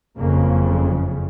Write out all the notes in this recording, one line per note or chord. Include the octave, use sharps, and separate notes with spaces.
F#1 F2 C#3 A#3